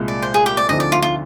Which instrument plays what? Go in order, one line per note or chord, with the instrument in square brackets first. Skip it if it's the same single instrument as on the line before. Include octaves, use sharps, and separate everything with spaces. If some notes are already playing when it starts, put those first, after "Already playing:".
Already playing: [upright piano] C2 A#2 G#3
[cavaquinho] D5
C5
G#4
G4
D5
[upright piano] D2 D3 F3 C4 D#4 [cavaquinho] D#5
[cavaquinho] D5
F4
F4